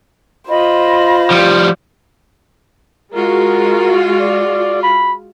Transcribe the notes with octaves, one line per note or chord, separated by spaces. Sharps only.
F4 C5 D#5 B5
F3 G3
G#3 F4 F#4 A#4
D5
B5